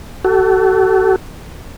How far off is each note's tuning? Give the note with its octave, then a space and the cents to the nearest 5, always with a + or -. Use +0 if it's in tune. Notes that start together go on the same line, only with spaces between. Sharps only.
F#4 +40 A4 +0